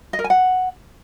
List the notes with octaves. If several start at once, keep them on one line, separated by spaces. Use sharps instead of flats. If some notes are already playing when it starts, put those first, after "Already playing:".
D#5
A#4
G#5
F#5